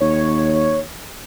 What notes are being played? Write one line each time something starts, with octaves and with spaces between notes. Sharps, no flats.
D#2 C#5